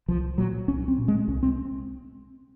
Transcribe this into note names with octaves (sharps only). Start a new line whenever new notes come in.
C2 F3
A#2 F#3
C2 C#4
C4
A#2
G#3
C2 C#4
C4